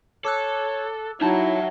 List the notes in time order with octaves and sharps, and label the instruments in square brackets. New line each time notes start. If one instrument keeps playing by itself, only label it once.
[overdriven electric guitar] A4 [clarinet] C#5 [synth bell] D6 E6 F#6
[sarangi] F#3 [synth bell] D#4 A5 [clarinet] E4 [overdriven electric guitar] C#5 E5